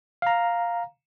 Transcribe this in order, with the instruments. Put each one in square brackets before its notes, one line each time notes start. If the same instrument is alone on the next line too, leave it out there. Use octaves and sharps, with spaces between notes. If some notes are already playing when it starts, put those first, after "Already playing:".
[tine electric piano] F5 A#5